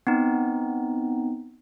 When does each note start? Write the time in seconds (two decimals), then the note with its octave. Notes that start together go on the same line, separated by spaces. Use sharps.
0.07 B3 C4 D#4